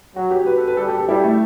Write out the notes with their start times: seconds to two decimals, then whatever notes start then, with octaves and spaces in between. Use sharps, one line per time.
0.16 F#3 F#4
0.31 G4
0.46 B4
0.57 A4
0.67 B4
0.77 G3 A4
0.88 G4
0.98 A4
1.08 G3 E4
1.24 A3